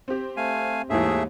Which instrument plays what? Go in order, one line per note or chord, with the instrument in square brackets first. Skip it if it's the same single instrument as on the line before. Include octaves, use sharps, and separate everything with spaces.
[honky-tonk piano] C4 G4
[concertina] A3 F5 G#5
[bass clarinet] D#2 [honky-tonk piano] G#2 E3 [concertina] A3 G#4 E5